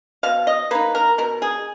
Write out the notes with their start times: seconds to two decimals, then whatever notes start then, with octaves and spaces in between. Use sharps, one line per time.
0.23 B2 F5
0.47 D#5
0.71 A#3 D#4 B4
0.95 A#4
1.18 B2 A#4
1.42 G#4